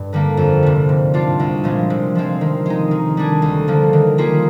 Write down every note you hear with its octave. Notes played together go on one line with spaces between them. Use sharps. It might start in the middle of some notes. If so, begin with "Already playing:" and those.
Already playing: G2
D3 G3 A#3
F2
C3 G3
G#2
G3 D4 F4
C2
A#2 F3 G#3
C3
F3 G#3 C4
D#3
G#3 D#4
D#3
G3 D4 G#4
D2
D3 F3 A#3
D#3
G3 A#3 F4 G#4